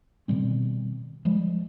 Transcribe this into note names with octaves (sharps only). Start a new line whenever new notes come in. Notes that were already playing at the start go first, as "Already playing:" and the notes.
B2 D#3 G3 C4
F3 G3 G#3